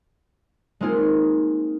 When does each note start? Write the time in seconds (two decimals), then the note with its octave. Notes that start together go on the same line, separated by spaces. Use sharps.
0.81 G#3 A#3 C4 D#4 F4 G#4